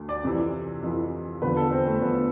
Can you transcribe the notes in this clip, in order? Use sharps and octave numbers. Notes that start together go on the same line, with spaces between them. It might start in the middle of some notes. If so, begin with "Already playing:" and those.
Already playing: D2 D3
D5
F2 C3 E3
F2 C3 E3
E2 D3 F3 B4
A4
C4
A3
E2 D3 F3 B3